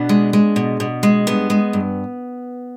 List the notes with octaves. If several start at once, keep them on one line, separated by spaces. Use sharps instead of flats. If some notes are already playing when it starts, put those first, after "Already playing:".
Already playing: B2 B3 D4
G#3
G#3
B2
B2
G#3
G2 B3
G#3
G2